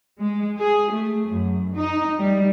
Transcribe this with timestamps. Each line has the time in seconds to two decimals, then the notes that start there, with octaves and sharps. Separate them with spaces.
0.21 G#3
0.57 G#4
0.91 A3
1.28 F#2
1.73 D#4
2.19 G3